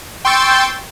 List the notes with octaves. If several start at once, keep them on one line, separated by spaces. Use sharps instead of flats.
G5 C6 C#6 E6 G6 A6